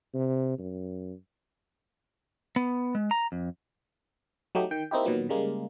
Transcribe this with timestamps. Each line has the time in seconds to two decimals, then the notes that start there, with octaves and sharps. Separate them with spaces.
0.14 C3
0.58 F#2
2.56 B3
2.95 G#3
3.11 A#5
3.32 F2
4.55 F#3 A3 D#4 G4
4.71 D#3 G5
4.91 A#3 C4 D#4 E4 G4
5.05 A#2 D#3 F#3 B3
5.29 C#3 G3 G#3 A#3